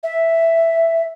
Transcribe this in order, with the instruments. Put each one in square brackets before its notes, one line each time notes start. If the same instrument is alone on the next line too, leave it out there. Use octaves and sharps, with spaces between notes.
[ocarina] E5